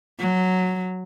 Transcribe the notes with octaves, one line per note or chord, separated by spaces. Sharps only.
F#3